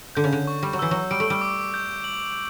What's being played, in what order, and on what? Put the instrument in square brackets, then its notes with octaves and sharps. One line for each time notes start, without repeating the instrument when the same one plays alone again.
[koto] D3 [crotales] G6
[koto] C#3
D3
[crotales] C#6
[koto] G3
F#3
[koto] E3 [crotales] E6
[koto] F#3
[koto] G3 [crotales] D7
[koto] A3
G3
[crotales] D6
G6
F#7